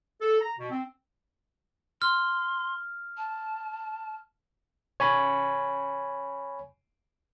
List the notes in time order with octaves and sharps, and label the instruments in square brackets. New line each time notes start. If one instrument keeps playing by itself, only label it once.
[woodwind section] A4
A#5
B2
C4
[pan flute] C6 [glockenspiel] F6
[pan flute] A5
[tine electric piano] C#5 G#5 B5